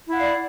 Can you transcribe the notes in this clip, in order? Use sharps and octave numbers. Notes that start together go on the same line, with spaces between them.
E4 D5 F5 F#5